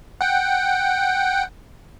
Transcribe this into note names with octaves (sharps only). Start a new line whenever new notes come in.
F#5 G5